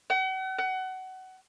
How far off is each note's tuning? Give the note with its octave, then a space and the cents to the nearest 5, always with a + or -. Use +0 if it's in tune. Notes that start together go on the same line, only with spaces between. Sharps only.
F#5 +40
F#5 +25